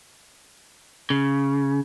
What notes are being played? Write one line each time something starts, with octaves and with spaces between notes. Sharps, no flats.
C#3